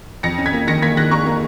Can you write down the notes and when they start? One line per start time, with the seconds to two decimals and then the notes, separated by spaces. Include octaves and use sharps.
0.23 F2 A#6 C#7
0.38 C#4
0.46 G#6 B6
0.53 A#3
0.68 D#3 A#6 C#7
0.82 A#3 G#6 B6
0.97 D#3 F#6 A#6
1.11 A#3 A#5 C#6
1.26 A#3